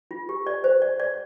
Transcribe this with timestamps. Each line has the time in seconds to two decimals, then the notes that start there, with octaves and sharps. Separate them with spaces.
0.11 F4
0.29 G4
0.47 D5
0.64 C5
0.82 D5
1.00 D5